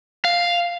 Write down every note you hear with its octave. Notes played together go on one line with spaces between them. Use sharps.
F5